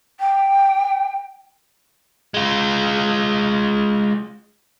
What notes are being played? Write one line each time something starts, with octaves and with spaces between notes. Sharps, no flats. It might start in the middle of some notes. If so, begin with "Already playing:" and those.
G5
G#3 F4